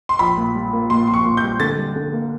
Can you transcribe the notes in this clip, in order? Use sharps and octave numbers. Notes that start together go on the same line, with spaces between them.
C6
A#1 B5
A#2
G3
A#3
A#2 C6
A#1 C6
C#6
A#2
G6
G3
D3 A6
G3
D3
A#3